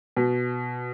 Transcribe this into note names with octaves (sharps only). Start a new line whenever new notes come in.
B2